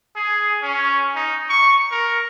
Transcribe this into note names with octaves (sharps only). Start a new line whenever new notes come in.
G#4
C#4
D#4
C#6
A#4